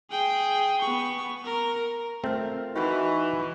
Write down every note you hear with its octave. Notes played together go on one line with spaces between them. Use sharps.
G#4 G5
B3 C#6
A#4
A3 C4 F4 A#4 F5
E3 D#4 F#4 B4